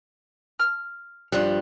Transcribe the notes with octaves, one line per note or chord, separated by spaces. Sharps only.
F6
G2 F3 G3 F#6